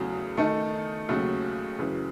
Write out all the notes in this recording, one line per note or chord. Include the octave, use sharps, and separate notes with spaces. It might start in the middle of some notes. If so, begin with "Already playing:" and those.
Already playing: E2 C#3 F#3 A3
D#3 A3 D#4 A4
D#2 C#3 F#3 A3
F#2 C#3 E3